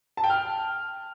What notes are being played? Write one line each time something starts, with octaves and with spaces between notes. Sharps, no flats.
A5
G5
F6